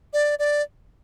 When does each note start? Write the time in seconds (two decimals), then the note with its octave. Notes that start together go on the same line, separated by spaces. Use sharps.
0.13 D5
0.39 D5